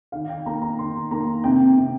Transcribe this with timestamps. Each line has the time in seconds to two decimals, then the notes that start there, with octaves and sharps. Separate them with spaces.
0.12 D#3 F5
0.29 G5
0.46 A#3 A#5
0.62 A#5
0.78 D#3 C6
1.11 A#3 A#5
1.44 C3 G5
1.77 C3